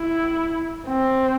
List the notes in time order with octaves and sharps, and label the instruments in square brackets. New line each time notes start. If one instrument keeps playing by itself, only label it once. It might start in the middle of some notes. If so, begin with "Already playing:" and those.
Already playing: [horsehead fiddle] E4
C4